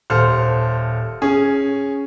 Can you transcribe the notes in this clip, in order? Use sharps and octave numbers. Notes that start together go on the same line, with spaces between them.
D#1 A4 C5 F6
C#4 G#4